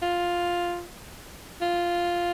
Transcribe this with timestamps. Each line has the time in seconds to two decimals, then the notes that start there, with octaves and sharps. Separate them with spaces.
0.02 F4
1.61 F4